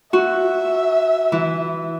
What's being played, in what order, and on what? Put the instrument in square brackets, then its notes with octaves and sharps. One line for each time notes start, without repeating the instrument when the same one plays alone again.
[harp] F#4 [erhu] E5
[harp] E3